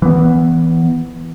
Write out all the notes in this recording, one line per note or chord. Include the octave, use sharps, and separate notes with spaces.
E3 B3